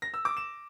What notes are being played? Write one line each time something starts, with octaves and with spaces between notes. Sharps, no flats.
A#6
E6
D6
E7